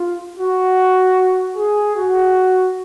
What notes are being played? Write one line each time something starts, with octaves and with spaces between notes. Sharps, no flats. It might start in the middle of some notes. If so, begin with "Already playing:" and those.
Already playing: F4
F#4
G#4
F#4